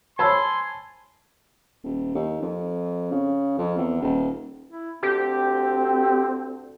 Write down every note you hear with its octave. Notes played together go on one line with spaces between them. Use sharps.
C5 C#5 G#5 A5 B5 C6 E6
D#1
D#2
F2
C#3
F2
E2
D#1
E4
D2 C4 G4